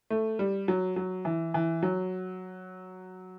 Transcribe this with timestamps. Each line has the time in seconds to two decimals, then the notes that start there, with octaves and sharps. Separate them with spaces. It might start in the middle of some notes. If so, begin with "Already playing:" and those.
0.10 A3
0.39 G3
0.68 F#3
0.96 F#3
1.25 E3
1.54 E3
1.83 F#3